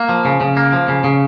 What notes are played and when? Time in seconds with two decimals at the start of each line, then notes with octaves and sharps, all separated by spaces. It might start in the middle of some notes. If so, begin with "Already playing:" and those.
Already playing: A#3
0.09 F3
0.25 C#3
0.41 C#3
0.57 A#3
0.72 F3
0.88 C#3
1.04 C#3